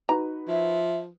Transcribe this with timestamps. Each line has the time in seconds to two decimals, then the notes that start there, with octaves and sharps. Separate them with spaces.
0.09 D#4 F#4 B4 A#5
0.48 F3 E5